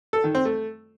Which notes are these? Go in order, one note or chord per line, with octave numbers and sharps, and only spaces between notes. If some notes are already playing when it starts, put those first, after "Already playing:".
A4
D#3
C4
A3